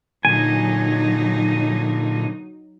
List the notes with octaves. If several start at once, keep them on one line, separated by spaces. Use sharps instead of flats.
A#2 D3 F#3 D#4 G#5